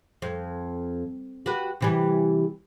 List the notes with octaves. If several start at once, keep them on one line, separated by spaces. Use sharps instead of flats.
F2
F#4 G4 B4
C3 E3 G3